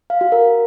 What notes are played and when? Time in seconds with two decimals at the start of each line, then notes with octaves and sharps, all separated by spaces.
0.10 F5
0.21 F#4
0.32 A#4